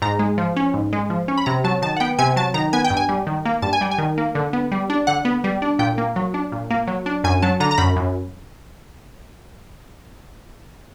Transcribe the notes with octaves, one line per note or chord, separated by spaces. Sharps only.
G#2 A#5
G#3
F3
C#4
G#2
G#3
F3
C#4
B5
C3 A#5
F#3 A5
D#3 A5
F#5
B3 G5
C3 G#5
F#3 A5
D#3 A#5
B3 G#5
G5
G2
G#5
G3
D#3
A#3
G2 A5
G#5
G3 G5
G#5
D#3
A#3
D3
B3
G3
D4
D3 F#5
B3
G3
D4
A#2 G5
A#3
F#3
D4
A#2
A#3
F#3
D4
F#2 G#5
F#3 A5
D3 A#5
A#5
F#2 B5
F#2